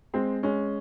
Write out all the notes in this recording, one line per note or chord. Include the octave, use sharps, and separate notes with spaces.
G#3 C4
G#3 C#4